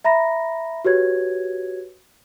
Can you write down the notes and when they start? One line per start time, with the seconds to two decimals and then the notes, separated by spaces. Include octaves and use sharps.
0.04 E5 A#5 B5 A#6
0.85 F#4 G4 B4 C#5 G#6